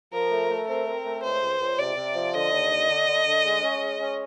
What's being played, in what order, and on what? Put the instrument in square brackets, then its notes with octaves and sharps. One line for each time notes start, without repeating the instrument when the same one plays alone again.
[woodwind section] F3 [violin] A#4
[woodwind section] A3
A3
[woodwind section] C4 [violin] A#4
[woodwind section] C4
A3
[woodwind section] C#2 [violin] C5
[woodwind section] C#2
C#2
[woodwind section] C3 [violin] D5
[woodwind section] C3
F3
[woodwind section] D3 [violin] D#5
[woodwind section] D#2
D3
D3
D3
D3
G#3
C#4
G#3
C#4